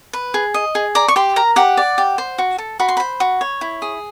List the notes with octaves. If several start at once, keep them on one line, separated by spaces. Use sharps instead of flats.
B4
G#4
D#5
G#4
D5 A#5
C#6
G4 C6
A#4 A#5
G4 F#5
D5
G4
C5
F#4
A4
F#4 B5
C6
C5 B5
F#4
C#5
E4
G#4